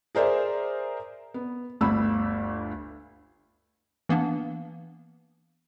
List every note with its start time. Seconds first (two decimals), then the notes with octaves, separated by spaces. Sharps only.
0.15 G#4 A#4 C5 D5 E5
1.34 B3
1.81 G1 D2 A3 B5 E6
4.09 E3 A#3 B3 D4